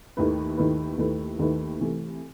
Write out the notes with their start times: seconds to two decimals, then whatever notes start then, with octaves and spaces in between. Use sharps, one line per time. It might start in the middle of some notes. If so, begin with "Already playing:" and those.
0.17 D#2 D#3 A3 E4 B4
0.57 D#2 D#3 A3 E4 B4
0.98 D#2 D#3 A3 E4 B4
1.39 D#2 D#3 A3 E4 B4
1.80 C3 E3 A3